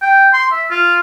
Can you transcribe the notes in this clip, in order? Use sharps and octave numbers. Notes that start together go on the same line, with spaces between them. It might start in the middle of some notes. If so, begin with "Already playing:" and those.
G5
C6
E5
F4